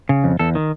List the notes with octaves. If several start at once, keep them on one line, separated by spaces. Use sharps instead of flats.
C#3
F2
E2 A4
D#3